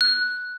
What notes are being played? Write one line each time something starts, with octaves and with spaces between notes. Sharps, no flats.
F#6